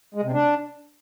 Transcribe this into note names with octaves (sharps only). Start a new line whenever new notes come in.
G#3
C3
D4